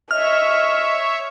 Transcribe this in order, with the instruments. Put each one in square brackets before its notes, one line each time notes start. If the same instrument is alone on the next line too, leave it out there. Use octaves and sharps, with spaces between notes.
[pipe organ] C#5 E5 [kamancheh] D#5 [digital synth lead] F6